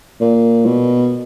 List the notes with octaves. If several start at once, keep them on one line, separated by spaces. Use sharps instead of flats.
A#2
B2